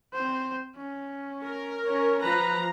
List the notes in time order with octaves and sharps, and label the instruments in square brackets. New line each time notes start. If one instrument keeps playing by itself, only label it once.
[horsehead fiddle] C4 C5
C#4
[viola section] A#4
[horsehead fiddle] C#4 C#5
[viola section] F3 A#5 [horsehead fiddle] B4